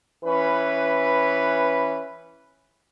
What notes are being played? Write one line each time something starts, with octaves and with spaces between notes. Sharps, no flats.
E3 C#4 B4